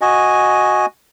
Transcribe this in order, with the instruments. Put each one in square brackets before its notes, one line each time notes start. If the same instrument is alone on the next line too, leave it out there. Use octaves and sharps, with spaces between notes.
[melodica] F#4 D#5 G#5